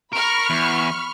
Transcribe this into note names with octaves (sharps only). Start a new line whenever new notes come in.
A#4 B5 C#6 F6
E2